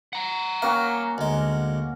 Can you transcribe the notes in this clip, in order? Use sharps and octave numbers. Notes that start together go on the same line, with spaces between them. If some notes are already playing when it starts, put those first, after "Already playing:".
F#5 A#5
A#3 C#4 F#4 F5
D2 G#3